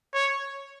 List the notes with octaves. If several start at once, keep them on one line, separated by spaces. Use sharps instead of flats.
C#5